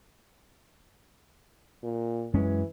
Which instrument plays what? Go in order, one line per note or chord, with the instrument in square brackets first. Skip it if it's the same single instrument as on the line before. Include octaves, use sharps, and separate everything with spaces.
[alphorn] A#2
[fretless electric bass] F#2 G#3 C#4 [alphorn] E3